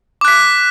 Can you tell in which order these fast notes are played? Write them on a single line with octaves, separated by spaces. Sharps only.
D6 F#6 B6